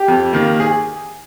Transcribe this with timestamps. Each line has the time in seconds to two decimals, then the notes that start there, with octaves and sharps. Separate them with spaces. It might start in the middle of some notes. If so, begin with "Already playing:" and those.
Already playing: G4
0.08 F2
0.33 D#3 A#3
0.60 G#4